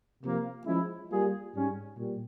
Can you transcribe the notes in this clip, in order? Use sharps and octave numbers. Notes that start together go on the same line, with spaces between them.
C3 F3 A#3
F3 G#3 C#4 E4
G3 A#3 F4 G#4
G#2 G3 C#4
A#2 G3